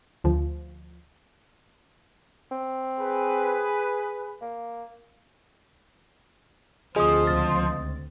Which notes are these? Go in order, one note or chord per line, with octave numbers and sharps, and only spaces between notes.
D2 F3
C4
G#4 B4
A#3
D2 F3 C4 G#4 D#5 D#6
C#2 A6